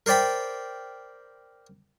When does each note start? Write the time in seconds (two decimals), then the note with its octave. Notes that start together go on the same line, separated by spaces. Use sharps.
0.06 A#4 C5 D5 G5 B5